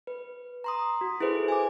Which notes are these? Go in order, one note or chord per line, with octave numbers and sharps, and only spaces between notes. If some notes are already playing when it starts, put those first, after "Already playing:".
B4
A#5 C6 D#6
F#4
E4 G#4 A4 B4 C5
G#5 D6